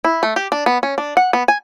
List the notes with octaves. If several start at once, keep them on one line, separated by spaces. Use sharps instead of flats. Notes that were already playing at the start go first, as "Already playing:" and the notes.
E4
A3
G4
D4
B3
C#4
D4
F#5
B3
G#5